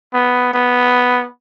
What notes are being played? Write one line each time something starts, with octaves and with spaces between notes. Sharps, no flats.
B3
B3